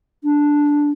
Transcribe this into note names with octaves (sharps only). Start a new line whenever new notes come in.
D4